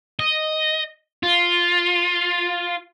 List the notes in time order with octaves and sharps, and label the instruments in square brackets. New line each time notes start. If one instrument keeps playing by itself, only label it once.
[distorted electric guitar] D#5
F4